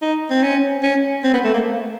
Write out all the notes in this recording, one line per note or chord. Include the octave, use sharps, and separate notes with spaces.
D#4
C4
C#4
C#4
C4
B3
A3
A#3